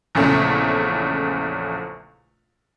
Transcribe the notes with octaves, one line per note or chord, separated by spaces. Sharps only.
A#1 E2 C#3 A3